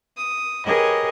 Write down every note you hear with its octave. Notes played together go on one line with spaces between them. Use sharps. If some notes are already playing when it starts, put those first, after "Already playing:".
D#6
G4 G#4 A#4 B4 C#5 D#5